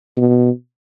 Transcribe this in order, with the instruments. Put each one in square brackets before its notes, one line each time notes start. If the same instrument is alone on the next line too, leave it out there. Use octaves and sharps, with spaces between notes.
[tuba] B2